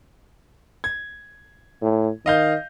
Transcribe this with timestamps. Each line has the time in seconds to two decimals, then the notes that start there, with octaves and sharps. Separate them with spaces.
0.84 G#6
1.82 A2
2.26 D#3 D#5 F5 G6